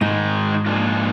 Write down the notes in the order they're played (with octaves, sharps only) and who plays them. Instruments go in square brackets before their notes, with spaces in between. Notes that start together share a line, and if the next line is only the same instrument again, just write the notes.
[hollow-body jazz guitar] G#2 [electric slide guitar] D#3 G#3 D#4
[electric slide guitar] A#2 F3 G#3 D4 F4